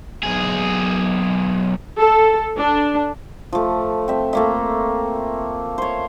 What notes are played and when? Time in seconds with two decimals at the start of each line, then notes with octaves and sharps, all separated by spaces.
0.23 B1 G#4
2.00 A4
2.58 D4
3.53 F3 A3
4.08 C4 E5
4.33 A3 A#3 E5
5.78 C5 C#5